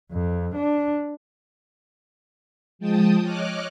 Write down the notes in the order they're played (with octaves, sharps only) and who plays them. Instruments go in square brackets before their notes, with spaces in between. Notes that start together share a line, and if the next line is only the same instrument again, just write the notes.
[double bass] F2
D4
[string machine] F3 G#3 G5 A5 D#6
C#5 D#5 D6 F6 F#6